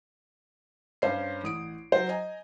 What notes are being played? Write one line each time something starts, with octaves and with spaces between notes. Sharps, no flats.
G2 C#4 C5 F5 C7
A1 D#6 D7
F#3 C5
D#5 G#5 A#5